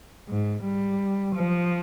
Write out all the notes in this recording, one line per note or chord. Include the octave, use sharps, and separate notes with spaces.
G#2
G3
F3